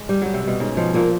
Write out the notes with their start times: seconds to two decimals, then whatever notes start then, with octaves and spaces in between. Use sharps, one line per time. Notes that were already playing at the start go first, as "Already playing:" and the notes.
Already playing: G#3
0.09 G3
0.22 F#3 G3
0.34 C3
0.43 B2 G3
0.60 G#2 C#4
0.77 B2 F3
0.94 A#2 A#3